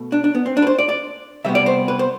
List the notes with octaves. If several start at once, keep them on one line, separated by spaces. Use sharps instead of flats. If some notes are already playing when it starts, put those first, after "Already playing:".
Already playing: B2 A3
D4
D4
B3
C4
D4
B4
C5
D5
D5
C3 G3 B3 E5
D5
C5
B4
C5